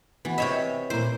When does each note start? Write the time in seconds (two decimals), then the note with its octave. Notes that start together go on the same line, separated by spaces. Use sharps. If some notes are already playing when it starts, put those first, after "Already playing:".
0.25 E3 B3 F#4
0.38 C3 C#5 D#5 E5
0.90 A#2 A#3 E4 C5